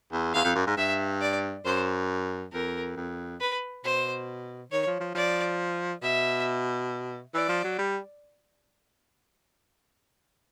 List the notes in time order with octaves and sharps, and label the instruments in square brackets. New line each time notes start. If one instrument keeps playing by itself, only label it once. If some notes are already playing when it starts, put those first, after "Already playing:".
[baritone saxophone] E2
[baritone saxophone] E2 [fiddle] F5
[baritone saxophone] F2
F#2
G#2
[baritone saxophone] G2 [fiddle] E5
[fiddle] D5
[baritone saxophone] F#2 [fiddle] C5
[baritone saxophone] F2 [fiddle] A#4
[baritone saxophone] F2
[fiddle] B4
[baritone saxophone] B2 [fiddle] C5
[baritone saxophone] D#3 [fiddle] C#5
[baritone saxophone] F3
F3
[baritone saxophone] F3 [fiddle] D5
[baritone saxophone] B2 [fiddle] E5
[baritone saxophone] E3 [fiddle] D5
[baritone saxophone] F3
F#3
G3